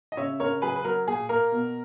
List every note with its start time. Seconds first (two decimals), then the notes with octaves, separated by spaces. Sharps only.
0.12 D#5
0.17 C#3 C#5 E5
0.40 C#2 A#4 C#5
0.62 F#3 G#4 B4
0.76 B4
0.85 F#3 A#4
1.07 A#2 G#4
1.29 A#3 A#4
1.52 B2